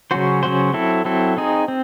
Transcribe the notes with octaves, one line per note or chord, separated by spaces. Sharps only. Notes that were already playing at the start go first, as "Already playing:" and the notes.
C#3 F#3 C#4 F#4 C5
C#3 F#3 C#4 F#4 C5
F#3 C4 E4 A4
F#3 C4 E4 A4
C4 D#4 G#4
C4